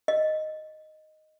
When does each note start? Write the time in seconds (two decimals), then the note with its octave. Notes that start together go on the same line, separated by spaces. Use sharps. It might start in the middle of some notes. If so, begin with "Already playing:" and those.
0.08 D#5